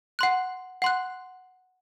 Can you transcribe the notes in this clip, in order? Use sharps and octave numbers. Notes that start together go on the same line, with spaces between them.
F#5 C6 F#6
F#5 C6 F#6